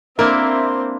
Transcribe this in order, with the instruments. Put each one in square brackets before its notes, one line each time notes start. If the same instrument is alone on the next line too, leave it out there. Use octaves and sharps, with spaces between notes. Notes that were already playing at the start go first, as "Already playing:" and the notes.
[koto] A#3 D4 E4 [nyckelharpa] C4 C5 [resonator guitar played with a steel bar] A#4 [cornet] E5